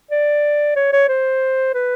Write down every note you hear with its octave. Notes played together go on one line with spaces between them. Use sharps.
D5
C#5
C#5
C5
B4